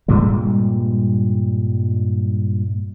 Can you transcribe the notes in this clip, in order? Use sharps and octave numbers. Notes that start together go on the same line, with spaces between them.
G2 A#2 G3 G#3